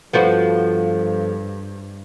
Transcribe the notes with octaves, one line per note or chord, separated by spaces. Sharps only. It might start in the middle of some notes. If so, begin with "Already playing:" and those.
G2 F3 B3 F#4 A4 C5 F5